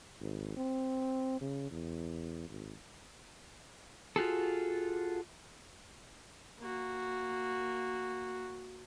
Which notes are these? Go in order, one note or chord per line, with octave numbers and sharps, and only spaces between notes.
G#1
C4
C#3
E2
G#1
F4 F#4 G#4 A4
A#3 F#4